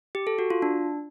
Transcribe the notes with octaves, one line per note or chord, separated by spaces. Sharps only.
G4
A4
F#4
F4
D4